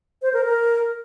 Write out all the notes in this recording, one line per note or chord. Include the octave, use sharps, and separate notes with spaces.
C5
A#4
A#4